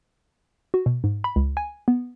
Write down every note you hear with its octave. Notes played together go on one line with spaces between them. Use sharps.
F#4
B2
G#2
B5
C#2
G#5
B3